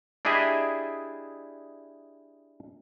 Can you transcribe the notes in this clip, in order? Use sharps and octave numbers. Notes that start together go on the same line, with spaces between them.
D4 E4 G4 G#4 D#5 E5